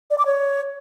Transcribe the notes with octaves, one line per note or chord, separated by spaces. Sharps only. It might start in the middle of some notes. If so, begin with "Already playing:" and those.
D5
D6
C#5